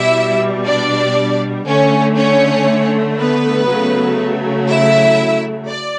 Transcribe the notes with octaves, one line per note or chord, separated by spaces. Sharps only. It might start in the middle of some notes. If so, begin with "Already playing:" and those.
Already playing: B2 G3 E4 E5
D4 D5
D3 A3 C#4 C#5
C#4 C#5
B3 B4
C#3 F#3 A3
E4 E5
D5